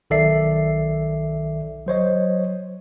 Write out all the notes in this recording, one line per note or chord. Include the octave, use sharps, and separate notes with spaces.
B1 D#3 A4 D5 E5 C7
F#3 C5 C#5 D#5